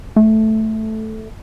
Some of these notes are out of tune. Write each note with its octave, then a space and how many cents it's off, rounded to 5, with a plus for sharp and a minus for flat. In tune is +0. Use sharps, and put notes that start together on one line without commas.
A3 -5